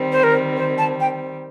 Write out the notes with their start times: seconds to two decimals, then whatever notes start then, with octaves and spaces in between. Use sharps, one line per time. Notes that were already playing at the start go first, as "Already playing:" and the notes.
Already playing: D#3 G3 C4
0.12 C5
0.23 A#4
0.57 C5
0.78 A5
1.00 G5